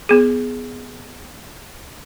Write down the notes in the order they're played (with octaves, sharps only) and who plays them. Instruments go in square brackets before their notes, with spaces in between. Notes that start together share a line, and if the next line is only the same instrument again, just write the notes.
[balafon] B3 G#4